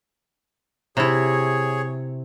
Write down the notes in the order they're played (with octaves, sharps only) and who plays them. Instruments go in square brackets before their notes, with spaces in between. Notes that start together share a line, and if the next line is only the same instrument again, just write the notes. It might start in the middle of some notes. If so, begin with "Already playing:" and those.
[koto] C3 E4 [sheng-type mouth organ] G#4 C#5